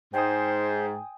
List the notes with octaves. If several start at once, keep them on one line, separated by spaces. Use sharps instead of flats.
G#2 C5 G5 G#5 D#6